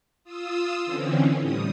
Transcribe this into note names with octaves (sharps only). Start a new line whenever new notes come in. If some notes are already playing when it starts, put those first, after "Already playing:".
F4 D#6 E6
D3 E3 C4 C#4
A2 G3 D#6